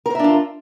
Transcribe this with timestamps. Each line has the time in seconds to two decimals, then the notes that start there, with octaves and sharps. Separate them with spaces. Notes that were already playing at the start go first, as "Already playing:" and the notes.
0.06 A#4
0.10 C5
0.15 E5
0.20 D4
0.24 F4